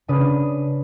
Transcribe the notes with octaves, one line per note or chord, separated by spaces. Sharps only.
C#3 D4 B4 D#6